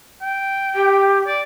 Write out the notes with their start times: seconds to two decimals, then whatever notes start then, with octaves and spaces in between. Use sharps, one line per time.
0.21 G5
0.75 G4
1.26 D5